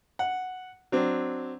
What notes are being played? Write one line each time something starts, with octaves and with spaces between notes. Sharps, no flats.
F#5
F#3 C4 D4